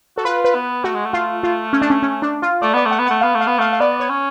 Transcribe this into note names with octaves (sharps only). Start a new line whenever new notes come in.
F#4 A4
F4 B4
B4
B3
A3 F#4
G#3
A3
F4
F4
C#4
D4
C#4
C#4
D4
F4
A3 D5
B3 D5
A3
F#5
B3
A3 F#5
B3 F5
A3
F5
B3
A3 F5
F5
B3 D5
C#5
C#4